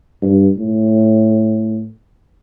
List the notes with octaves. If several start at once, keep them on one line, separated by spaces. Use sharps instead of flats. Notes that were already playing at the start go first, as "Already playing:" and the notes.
G2
A2